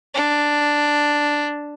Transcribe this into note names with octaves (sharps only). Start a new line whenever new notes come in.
D4